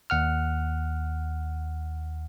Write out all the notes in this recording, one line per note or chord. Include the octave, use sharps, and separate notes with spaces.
D#2 F#5 F6